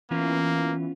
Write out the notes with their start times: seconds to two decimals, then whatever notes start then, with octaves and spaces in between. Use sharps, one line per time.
0.11 E3 A#3 B3 C#4 F4